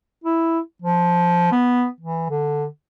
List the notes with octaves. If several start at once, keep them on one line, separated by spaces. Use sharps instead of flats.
E4
F3
B3
E3
D3